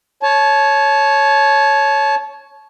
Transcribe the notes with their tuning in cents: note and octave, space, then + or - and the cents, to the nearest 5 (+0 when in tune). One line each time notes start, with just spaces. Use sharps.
C#5 +0 A5 -25